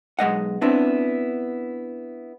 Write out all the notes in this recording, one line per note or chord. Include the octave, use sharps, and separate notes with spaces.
B1 G#3 D#5 F#5
B3 C4 D4 E4